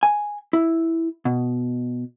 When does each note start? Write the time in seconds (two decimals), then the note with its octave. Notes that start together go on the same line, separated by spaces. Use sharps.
0.03 G#5
0.53 E4
1.25 B2